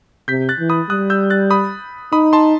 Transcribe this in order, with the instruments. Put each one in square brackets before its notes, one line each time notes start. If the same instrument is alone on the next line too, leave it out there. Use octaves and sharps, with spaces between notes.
[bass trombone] C3 [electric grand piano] G6 B6
[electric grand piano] F#6 A6
[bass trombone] E3
[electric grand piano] B5 D#6
[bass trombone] G3 [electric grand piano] D#6 F#6
[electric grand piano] E6 G6
F#6 A6
B5 D#6
[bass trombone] D#4 [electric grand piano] B5 D#6
[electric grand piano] A5 C6